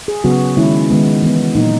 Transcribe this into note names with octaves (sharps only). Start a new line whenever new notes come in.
G#4
C#3 F#3 B3 F#4
D#3 G#3 C#4 E4
D#3 G#3 B3
E3 B3
A#2 F#3 A#3 D#4